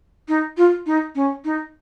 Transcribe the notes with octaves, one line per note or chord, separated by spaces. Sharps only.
D#4
F4
D#4
C#4
D#4